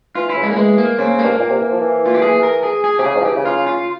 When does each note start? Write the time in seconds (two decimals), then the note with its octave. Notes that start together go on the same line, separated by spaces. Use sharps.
0.15 E3 F4
0.29 E4
0.36 C#3
0.43 G#3
0.51 A#3
0.56 E3 G#3
0.78 A#3
0.98 C#3 C4
1.19 G2 A#3
1.31 G#2
1.39 A#2
1.50 C3
1.60 E3
1.71 F3
1.81 E3
2.06 F4
2.14 G4
2.22 G#4
2.43 A#4
2.63 G#4
2.84 G#4
2.98 C3 G4
3.04 C#3 G#4
3.15 G#2
3.20 F3
3.25 E3 G4
3.36 C#3
3.45 F4
3.67 F4